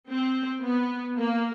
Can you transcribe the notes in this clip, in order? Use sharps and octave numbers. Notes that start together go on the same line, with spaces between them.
C4
B3
A#3